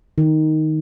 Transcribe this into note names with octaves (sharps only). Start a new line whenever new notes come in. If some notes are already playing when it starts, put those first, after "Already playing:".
D#3